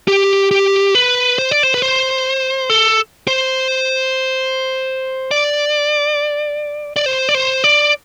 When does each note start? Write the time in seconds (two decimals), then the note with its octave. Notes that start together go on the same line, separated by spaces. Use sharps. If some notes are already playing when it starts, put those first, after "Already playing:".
0.08 G4
0.51 G4
0.95 B4
1.38 C5
1.51 D5
1.63 C5
1.74 B4
1.82 C5
2.70 A4
3.27 C5
5.31 D5
6.96 D5
7.06 C5
7.29 D5
7.35 C5
7.64 D5